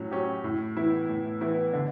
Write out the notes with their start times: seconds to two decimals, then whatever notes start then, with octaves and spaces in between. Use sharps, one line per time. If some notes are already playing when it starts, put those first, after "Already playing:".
Already playing: A2 F#3 C#4
0.11 F#3 C#4 G4
0.44 A2
0.77 E3 B3 E4
1.09 A2
1.41 E3 B3 E4
1.73 D3